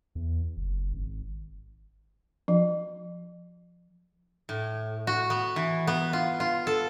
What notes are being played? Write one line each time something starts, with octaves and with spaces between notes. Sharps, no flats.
E2
F#1
G#1
F3
A2
F#4
B3
E3
B3
F4
F4
A4